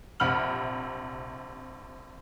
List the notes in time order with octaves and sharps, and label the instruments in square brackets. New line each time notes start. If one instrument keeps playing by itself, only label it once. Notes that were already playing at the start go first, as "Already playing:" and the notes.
[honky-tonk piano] A#1 C3 F#5 B5 F6 F#7